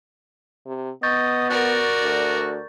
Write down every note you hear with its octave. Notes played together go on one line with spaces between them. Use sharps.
C3
B3 D#5 C#6 G6 A6
F#4 A#4 D5
D2